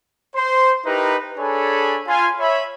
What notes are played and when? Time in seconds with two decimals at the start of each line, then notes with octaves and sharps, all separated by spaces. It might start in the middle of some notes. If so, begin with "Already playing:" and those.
0.35 C5 C6
0.85 D#4 E4 G4 A#4 B4
1.37 D4 G#4 A4 C#5 G#5 B5
2.07 F4 G#5 C6
2.40 C#5 E5 B5